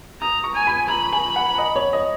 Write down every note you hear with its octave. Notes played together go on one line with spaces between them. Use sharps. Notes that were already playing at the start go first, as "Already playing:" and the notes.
A#5 D#6
C#6
G#5
B5
A#5 B5
G#5
F#5
D#5
C#5
D#5